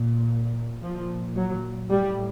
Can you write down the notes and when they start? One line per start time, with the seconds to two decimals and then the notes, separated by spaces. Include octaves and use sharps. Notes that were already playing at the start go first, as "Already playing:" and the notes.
Already playing: A#2
0.83 A#2 F3
1.36 F#3
1.90 A2 G3